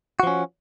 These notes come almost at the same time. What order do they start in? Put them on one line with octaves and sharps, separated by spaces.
F#4 F3 C#4